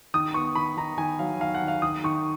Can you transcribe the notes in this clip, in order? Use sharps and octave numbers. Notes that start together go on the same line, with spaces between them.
D#3 D#6
B3 C#6
D#3 B5
D#3 A#5
D#3 G#5
F#3 F5
D#3 F5
F#5
D#3
F5
D#3 D#6
D#3 C#6